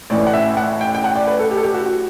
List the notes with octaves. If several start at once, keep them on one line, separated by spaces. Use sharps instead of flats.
A1 A2 E3 D5
F#5
E5
F#5
G5
G5
F#5
D5
B4
A4
G4
A4
G4
F#4
F#4